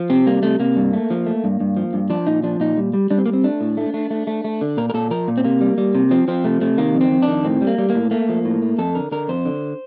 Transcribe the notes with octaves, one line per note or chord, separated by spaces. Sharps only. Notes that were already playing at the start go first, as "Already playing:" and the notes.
Already playing: F3
C3 C4
G3 A#3
C3 A3
C3 A#3
G2
A3
F3
A3
G2
G2
F3
G2
F3 D4
A#2 D#4
F3 D4
A#2 D#4
G3
G3
G3 D4
C4
G3 A#3
C4
A3 D4
A2
A3
A3
A3
A3
A3
D3
A#2 A#4
A#4
A#2 A4
F3 A#4
A#2
C4
C3 A#3
G3
G3
C3
F3 C4
F3 C4
C3 A3
C3 A3
D#3 A#3
F2
C4
F2
D4
D#3
A2 C4
G3
A#3
G3
A2 A#3
A3 A#3
F3
A2
A3
F2 A4
D3 A#4
D3 A#4
F2 C5
D3